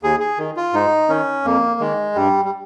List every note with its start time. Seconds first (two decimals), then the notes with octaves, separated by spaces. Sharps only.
0.03 D#2 G#4
0.20 G#4
0.38 D#3
0.57 F4
0.73 G#2 D#4
1.09 D#3 C#4
1.45 F2 A#3
1.80 D#3 G#3
2.15 G2 G3
2.45 G3